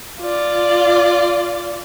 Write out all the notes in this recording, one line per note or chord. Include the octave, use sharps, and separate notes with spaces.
F4 D5